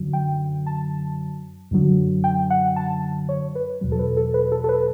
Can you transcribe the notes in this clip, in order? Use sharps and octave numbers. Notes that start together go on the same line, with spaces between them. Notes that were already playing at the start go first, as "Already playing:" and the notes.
Already playing: F#2 D3 F#3
G5
A5
F#2 D3 F#3
G5
F#5
A5
C#5
B4
E2 B2 F#3
A4
B4
A4
B4
A4
A4
B4